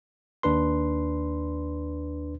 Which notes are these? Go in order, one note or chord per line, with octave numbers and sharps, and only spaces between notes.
D#2 D4 B4 C6